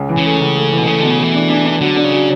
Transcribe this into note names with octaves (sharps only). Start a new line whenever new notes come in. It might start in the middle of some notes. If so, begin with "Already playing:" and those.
Already playing: C#2 C#4
E3
C#3
A3
C#2
A3
E3
B2
C#3 A3
B2 D3
C#3
E3 A3
D4
D4
D4
D3 F#3
D4
C#3
F#3